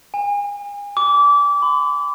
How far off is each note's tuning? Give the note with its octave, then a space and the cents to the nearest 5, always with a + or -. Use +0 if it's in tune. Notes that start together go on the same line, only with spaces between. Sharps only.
G#5 -35
D6 -25
B5 +40